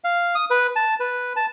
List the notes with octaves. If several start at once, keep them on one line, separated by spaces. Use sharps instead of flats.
F5
D#6
B4
A5
B4
A5